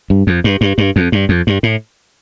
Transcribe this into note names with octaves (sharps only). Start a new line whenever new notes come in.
G2
F2
G2
G2
G2
F2
G2
F2
G2
A2